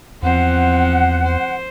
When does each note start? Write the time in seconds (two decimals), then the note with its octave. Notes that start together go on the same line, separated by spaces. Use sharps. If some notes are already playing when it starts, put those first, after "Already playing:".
0.22 E2 F3 C4 C5 F#5
1.25 C5